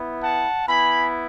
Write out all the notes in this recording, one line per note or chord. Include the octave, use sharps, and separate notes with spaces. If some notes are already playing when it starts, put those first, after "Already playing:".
Already playing: B3 E4
F#5 A5
B3 E4 G#5 B5